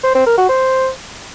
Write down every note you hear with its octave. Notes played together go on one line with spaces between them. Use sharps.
C5
C4
A#4
F#4
C5